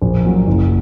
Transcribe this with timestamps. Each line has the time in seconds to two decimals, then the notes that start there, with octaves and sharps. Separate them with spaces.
0.02 A#1
0.25 A#2 F#3
0.47 F#1